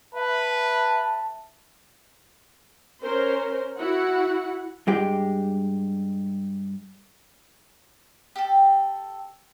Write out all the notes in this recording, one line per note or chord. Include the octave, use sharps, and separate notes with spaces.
B4 E5 A5
C#4 A#4 C5
E4 F#4 F#5
G2 G#3 G4
G4 A4